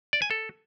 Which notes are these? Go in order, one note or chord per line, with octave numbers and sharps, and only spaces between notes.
D5
G#5
A4